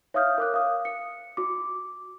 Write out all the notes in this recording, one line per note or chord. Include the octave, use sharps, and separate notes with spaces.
C#5 E5 F5 D#6 F6 G6
A#4 D6 F#6
F5 D#6
C#7
F#4 D6